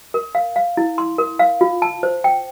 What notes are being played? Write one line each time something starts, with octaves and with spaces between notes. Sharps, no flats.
A#4
F5
F5
E4
C6
A#4
F5
F4
A5
C5
G5